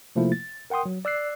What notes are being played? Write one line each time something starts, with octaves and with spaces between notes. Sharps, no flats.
C3 F3 A3 A#3 E4 F4
A6
A#4 F#5 G5 C6 D#6
F#3
D5 E6 F#6 C7